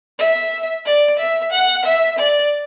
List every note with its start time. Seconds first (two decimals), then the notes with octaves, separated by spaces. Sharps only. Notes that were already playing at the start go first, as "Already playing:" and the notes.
0.19 E5
0.86 D5
1.19 E5
1.52 F#5
1.85 E5
2.19 D5